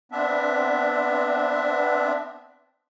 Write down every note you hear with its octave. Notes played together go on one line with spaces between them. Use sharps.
B3 C4 D4 E5